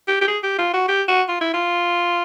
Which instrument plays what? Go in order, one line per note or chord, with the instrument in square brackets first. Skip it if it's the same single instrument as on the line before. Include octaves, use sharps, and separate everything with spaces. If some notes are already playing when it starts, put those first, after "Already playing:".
[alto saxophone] G4
G4
G#4
G4
F4
F#4
G4
F#4
F4
E4
F4